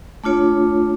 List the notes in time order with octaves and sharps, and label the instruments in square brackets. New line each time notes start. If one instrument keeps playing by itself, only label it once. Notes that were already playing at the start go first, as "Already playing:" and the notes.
[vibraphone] A3 D4 F4 C#5